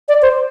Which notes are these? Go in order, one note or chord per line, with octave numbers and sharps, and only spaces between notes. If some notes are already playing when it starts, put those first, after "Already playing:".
D5
C5